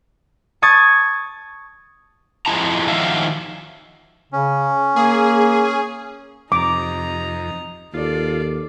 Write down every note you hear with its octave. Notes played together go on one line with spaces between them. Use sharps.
A5 C#6 D#6 G#6 A6
F2 F3 G#3 E4 A5 A#5
D#3 F3 F#3 E5 F5
C#3 C#4
A#3 G#4
F2 C3 D#4 A#5 D6
D#2 F4 A4 D5